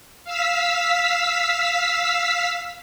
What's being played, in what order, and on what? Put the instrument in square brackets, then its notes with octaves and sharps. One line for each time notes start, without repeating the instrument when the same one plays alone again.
[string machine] F5 E6 B6